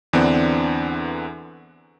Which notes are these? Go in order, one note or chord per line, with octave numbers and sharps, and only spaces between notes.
E2 D3 E3 B3 C4 D4